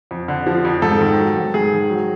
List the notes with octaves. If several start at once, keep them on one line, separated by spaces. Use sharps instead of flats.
F2
D3
F3
F2
G#2 A4
D#3
F#3
G#2
G#2 G#4
D#3
F#3